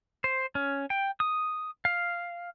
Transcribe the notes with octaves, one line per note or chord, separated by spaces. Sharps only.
C5
C#4
G5
D#6
F5